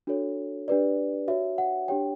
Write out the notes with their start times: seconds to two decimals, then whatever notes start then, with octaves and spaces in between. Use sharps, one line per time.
0.07 D4 F#4 A4 C#5
0.68 D4 G4 B4 D5
1.28 F#4 C#5 E5
1.58 F#5
1.88 D4 G4 C#5 G5